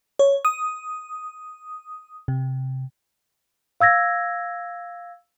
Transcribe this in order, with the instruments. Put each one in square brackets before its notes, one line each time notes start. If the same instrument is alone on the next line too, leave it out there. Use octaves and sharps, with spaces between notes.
[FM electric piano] C#5
D#6
C3
[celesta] F5 E6 G#6 A#6